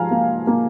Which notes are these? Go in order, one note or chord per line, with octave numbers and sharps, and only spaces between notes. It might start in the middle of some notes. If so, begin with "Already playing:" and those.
Already playing: G#2 F3 F5 G#5 A#5
A#3
A#3